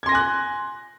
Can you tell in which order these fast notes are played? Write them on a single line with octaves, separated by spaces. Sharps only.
G#6 C6 A#6 G#5 F#6